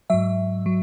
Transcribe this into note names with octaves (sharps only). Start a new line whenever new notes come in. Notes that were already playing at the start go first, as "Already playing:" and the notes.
G#2 F#3 E5
F#3